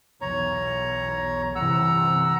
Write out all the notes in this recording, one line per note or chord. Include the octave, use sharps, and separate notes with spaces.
B1 E2 C#5 A#5
G1 C3 E3 F#5 A#5 E6